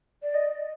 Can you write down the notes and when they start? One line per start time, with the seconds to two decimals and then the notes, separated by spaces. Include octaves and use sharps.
0.23 D5
0.34 D#5